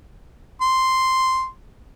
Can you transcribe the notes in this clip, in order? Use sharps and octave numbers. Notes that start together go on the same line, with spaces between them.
C6